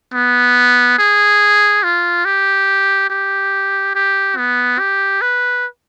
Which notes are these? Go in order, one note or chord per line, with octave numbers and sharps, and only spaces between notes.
B3
G#4
F4
G4
G4
G4
B3
G4
B4